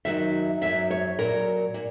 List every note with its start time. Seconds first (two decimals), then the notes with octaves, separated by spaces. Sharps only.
0.05 F#2 D#3 F#3 E5
0.61 F#2 D#3 F#3 E5
0.90 C#5
1.19 A#2 F#3 A#4
1.74 A#2